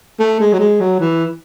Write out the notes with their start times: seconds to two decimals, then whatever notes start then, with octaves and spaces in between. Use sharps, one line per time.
0.20 A3
0.40 G#3
0.53 F#3
0.60 G#3
0.81 F#3
1.00 E3